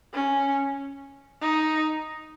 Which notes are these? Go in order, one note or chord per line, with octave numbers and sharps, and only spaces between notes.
C#4
D#4